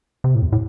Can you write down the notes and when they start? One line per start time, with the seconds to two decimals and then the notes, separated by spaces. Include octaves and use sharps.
0.24 C3
0.35 A2
0.42 E2
0.52 A2